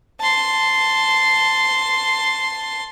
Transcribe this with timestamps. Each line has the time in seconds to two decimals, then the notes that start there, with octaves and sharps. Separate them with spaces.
0.20 A5 C6